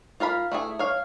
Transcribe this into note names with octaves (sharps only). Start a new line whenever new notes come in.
F4 A#4 F5 B5
A3 E4 G#4
C#5 F5